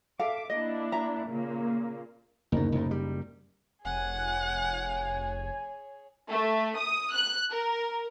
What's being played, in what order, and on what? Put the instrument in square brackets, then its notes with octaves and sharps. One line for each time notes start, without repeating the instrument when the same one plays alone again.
[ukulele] A4 F5 [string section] E5 D6
[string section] A#3 D4 E4 [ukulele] D#5
[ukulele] E5 A#5
[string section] A#2 C#3 A#3
[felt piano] F#1 A#3 D#4 [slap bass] D2 B2
[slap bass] C2 A2
G3
[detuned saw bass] F1 [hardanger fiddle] G#4 C#5 [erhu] F#5 [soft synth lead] G#5
[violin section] A3
D#6
F#6
A#4